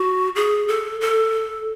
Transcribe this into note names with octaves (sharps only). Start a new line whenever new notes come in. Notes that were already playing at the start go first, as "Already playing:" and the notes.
Already playing: F#4
G#4
A4
A4